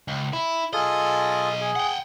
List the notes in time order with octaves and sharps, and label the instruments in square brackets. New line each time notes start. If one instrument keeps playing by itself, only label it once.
[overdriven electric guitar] C#2
E4
[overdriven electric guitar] B1 D#5 [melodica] F4 G#4 A4
[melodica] G#4
[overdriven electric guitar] F#5 G5